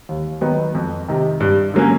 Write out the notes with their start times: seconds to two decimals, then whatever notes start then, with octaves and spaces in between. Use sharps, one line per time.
0.09 D#2
0.41 D#3 F#3 B3
0.75 F2
1.08 C3 D#3
1.40 G2
1.74 D3 F#3 A#3 C#4